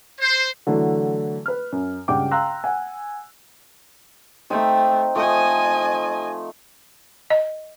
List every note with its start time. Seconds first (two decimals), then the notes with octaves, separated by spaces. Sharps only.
0.21 C5
0.67 D3 E3 F#3 A3 A4
1.46 B4 F6
1.72 F#2
2.08 C#2 G2 F#5 G5 D6
2.31 F5 G5 A#5 C6 E6 F#6
2.64 F#5 G#5
4.50 A3 C4 D#4 G5
5.16 F3 A3 D#5 G#5
7.30 D#5